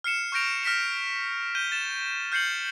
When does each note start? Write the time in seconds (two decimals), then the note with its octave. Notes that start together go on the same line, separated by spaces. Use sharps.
0.04 F6 C7 C#7 E7
0.32 C#6 F6 G6 A#6 D7 F7
0.63 F6 A#6 B6 C#7 E7
1.55 G6 D#7 G7
1.72 A6 E7
2.32 F6 G6 C7 C#7 F#7